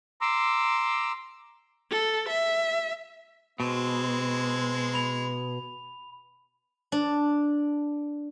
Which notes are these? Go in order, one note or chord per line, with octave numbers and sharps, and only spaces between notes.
A#5 C6 D6 E6
A4
E5
B2 G#3 C4
B5 F7
D4